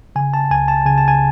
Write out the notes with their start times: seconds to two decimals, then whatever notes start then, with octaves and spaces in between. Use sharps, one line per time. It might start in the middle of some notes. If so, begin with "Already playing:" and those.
0.16 C#3 G#5
0.34 A5
0.51 C#2 G#5
0.68 A5
0.86 C#3 G#5
0.98 A5
1.08 G#5